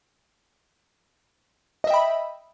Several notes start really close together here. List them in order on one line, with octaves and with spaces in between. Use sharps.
D#5 E5 G5 B5